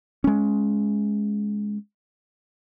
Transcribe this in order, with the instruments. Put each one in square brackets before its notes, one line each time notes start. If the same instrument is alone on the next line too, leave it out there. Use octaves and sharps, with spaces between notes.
[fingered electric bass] G#3 C#4